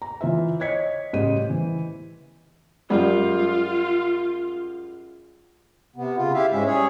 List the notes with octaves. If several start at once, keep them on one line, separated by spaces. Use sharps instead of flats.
A#5
E3 F4 C5 E5
C#5 D#5 G#6 B6 C#7
A1 C#3 G3 C5 D#5 D#7
E3
F#2 G3 G#3 F4
C3 B3
C#3 F4
E4 G4 E5 F5
G#2 G#3 C#4 E5
G3 C#4 G#4 C#5